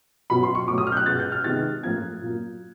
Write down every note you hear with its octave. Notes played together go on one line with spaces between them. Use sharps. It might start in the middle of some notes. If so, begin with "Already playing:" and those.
B2 F#3 B3 B5
C6
C#6
B2 F#3 A3 D6
D#6
F6
G6
F#6
B2 G#3 B3 A6
G6
F6
C3 D#3 G#3 B3 A6
A2 F3 A#3 G#6
A#2 F#3 A#3